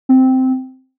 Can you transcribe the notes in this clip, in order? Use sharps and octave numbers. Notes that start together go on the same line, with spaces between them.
C4